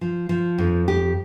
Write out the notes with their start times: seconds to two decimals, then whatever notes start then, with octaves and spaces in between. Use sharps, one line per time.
0.01 F3
0.29 F3
0.58 F2
0.88 G4